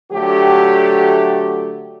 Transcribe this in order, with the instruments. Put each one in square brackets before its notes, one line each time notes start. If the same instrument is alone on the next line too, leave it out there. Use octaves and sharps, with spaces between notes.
[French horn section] D3 F#3 A3 G4